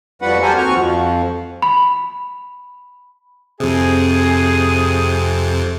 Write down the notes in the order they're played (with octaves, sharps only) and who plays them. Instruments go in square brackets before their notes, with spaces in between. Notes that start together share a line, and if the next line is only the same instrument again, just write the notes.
[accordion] F2 F3 G3 F#4 B4 F#5
G4 A4 A#4 C5 F#5 G#5
D#2 C4 F#4 C#6 F6
F2 F3
[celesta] B5
[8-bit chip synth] F2 C3 [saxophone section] G#4